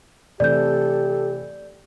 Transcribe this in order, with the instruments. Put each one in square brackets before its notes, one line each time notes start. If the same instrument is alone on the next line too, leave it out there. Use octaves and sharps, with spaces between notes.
[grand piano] C3 E3 A3 [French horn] G4 [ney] A4 [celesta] D5 G6